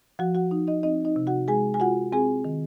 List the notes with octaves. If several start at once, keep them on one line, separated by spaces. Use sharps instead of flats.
F3 F#4 F#5
F#4 F#5
D#4
D#4 D#5
C4 D#4 D#5
D#4 D#5
C3
F#4 F#5
G#3 G#4 G#5
G#5
F4 F#4 F#5
C4 G#4 G#5
D#3